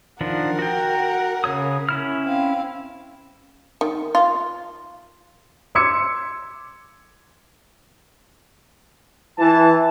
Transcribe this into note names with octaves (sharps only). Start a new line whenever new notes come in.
D#3 F3 D4 A#4 F#5
F#4 G5
C#3 C#5 D#6
C#4 E4 F6
C4 F5
D#3
F4
C6 D6 E6 G#6 C#7
E3 A5